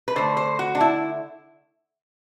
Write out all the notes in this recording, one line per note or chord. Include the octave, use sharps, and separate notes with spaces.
B4
D3 A3 C5
C5
F#4
D4
E4